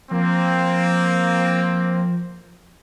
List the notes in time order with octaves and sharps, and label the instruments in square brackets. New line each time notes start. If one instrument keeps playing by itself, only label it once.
[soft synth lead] F3 [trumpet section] A#3 C4